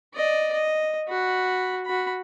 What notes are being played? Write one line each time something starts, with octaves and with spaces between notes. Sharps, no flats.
D5 D#5
D#5
F#4 B5
F#4 B5